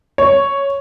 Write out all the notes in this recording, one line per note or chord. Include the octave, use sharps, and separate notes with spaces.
C#5